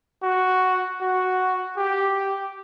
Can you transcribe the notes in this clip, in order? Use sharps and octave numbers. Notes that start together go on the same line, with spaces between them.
F#4
F#4
G4